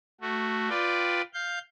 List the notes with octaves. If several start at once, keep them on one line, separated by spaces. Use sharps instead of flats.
A3 F#4
F4 B4 D5 G5
F5 G6